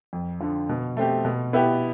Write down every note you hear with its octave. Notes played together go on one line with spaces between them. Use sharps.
F2
D3 F3
B2
A3 C4 G4
B2
B3 E4 G4